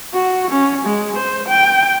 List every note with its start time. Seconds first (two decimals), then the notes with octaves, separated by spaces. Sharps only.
0.13 F#4
0.51 C#4
0.85 G#3
1.16 C5
1.48 G5